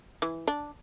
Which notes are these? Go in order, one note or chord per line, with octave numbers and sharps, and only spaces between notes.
E3
D4